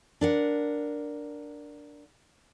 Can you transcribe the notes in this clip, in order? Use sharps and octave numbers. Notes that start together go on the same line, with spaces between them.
D4 A#4 F#5